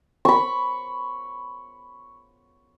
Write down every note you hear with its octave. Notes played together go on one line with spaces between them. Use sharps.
B5 C#6